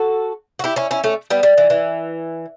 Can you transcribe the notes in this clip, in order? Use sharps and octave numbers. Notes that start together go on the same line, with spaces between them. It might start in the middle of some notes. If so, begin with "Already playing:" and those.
Already playing: F#4 A4
F#4
E4 G4
C#4 E4
C#4 E4
A3 C#4
G3 B3
G3
E3
E3